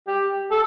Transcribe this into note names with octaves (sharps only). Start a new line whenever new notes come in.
G4
A4